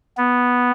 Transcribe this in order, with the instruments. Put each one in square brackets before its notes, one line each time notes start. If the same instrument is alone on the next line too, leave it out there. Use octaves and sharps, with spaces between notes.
[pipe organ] B3